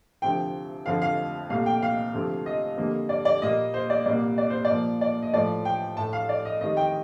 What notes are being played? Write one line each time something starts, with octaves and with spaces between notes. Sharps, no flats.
D2 C3 F3 G5
F2 D3 F3 F5
F5
C2 A#2 A3 F5
G5
F5
D2 C3 F3 A3
D#5
F2 D3 G3 A#3
D5
D5
A#2 G3 A#3 D#5
C5
D5
C2 A#2 G3 A#3 D5
D5
C5
D5
A#2 F3 A#3
D5
D#5
A2 F3 A3 D5
G5
A2 A3 A5
F5
D5
D#5
F2 D#3 G3 D#5
G5